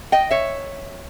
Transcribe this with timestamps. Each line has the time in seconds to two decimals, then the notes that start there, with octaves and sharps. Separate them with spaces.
0.12 D#5 G5
0.31 C#5 E5